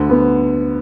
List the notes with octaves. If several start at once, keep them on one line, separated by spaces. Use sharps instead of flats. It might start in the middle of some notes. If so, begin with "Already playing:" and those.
Already playing: D2 D3
B3